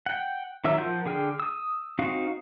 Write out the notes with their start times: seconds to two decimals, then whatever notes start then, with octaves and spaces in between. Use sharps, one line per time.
0.06 F#5 G5
0.64 D#3 F#3 E5 E6
0.78 F3 F4 A#4 F#5 G6
1.06 D3 G#4 G5 F6
1.40 D#6 E6
1.99 C4 D#4 F#4 F5